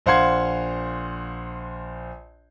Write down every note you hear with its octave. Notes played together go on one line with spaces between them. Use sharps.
A#1 C5 F5 F#5 C6 G#6